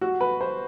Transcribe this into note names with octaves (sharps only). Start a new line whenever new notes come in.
F#4
B4
C5